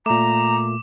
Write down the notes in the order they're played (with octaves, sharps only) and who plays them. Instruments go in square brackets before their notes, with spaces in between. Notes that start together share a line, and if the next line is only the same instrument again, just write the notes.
[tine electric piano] A#2 A3 [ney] A#5 [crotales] D6